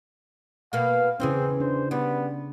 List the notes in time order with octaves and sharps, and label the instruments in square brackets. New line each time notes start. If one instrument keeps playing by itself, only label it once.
[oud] B2 A#3 B3 [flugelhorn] F5
[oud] E2 E3 G#4 [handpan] C#3 C#4 [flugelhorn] C4
[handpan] D4 [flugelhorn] C5
[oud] G3 [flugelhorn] B3